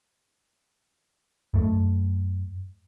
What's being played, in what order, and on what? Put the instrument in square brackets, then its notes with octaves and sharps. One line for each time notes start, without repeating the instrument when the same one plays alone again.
[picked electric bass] F#2 A3